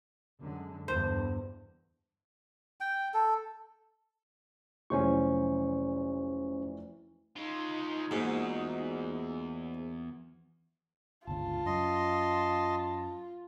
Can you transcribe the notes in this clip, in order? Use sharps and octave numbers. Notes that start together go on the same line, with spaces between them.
F#2 D3 G#3
E2 G2 D3 C5
G5
A4
F1 E3 F#3 C#4 C5 C#6
G#3 D#4 F4
E2 G#2 A#3 F4 F#4
G1 C#2 F4 A5
F#2 D#5 C6